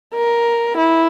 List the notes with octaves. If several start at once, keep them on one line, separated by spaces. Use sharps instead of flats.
A#4
E4